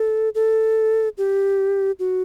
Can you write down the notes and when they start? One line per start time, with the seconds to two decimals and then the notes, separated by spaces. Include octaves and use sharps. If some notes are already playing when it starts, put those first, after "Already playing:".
Already playing: A4
0.35 A4
1.18 G4
1.99 F#4